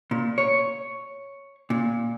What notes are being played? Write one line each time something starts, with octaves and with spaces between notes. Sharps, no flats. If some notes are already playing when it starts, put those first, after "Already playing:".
A#2
C#5
A#2